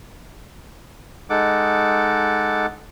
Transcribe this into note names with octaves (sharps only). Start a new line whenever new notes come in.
G#3 D#4 A4 F#5 D6